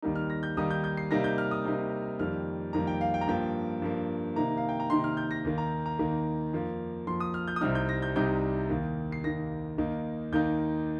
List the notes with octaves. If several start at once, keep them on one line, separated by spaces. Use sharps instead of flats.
D#2 D#3 G3 A#3 D#4
F6
A#6
G6
D#2 D#3 G3 A#3 D#4 D#6
G6
G6
C7
C3 G3 A#3 D#4 A#6
G6
F6
D#6
C3 G3 A#3 D#4
F2 D#3 G3 A#3 F6
F2 D#3 G3 A#3 A#5
G5
F5
G5
A#5
G2 F3 A#3 G5
G2 F3 A#3
C3 D#3 A#3 D#4 A#5
F5
G5
A#5
C3 D#3 A#3 D#4 C6
F6
G6
A#6
D#2 D#3 A#3
A#5
A#5
D#2 D#3 A#3
F2 F3 A#3
F2 F3 A#3 C6
D#6
F6
G6
D#6
C2 C3 G3 C4 D#4 F6
G6
A#6
G6
C2 C3 G3 C4 D#4 G6
D#2 D#3 A#3
C7
D#2 D#3 A#3 A#6
D#2 D#3 A#3 D#4
D#2 D#3 A#3 D#4 G6